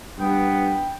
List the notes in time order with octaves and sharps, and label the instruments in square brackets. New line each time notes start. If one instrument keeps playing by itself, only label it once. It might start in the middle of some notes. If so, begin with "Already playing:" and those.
[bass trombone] G2 [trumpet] B3 [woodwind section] G5